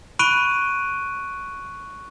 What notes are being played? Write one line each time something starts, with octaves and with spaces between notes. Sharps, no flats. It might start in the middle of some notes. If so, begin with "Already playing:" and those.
B5 C#6 F#6 D7 D#7